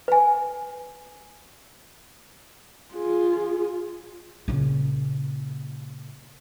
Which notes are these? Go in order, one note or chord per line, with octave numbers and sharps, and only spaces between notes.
B4 G#5
F4 G#4
A#2 C#3